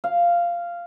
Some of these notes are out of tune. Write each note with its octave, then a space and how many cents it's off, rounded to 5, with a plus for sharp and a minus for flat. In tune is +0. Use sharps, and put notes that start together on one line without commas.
F5 -10